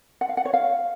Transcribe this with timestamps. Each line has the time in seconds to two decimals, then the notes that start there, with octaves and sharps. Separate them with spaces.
0.21 F#5
0.29 F5
0.37 F#5
0.45 C#5
0.54 F5